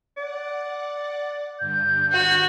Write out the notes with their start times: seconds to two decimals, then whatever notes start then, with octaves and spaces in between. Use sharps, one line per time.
0.17 D5 F#5
1.60 G2 D3 G6
2.12 F#4 F#5